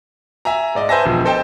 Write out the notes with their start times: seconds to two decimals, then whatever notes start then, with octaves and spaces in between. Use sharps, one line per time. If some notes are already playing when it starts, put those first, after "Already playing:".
0.45 E5 G#5 A#5
0.75 G#2 D5 D#5
0.89 B4 C5 E5 G#5 A5 A#6
1.06 E1 F3
1.25 A4 C5 D#5 G5 A5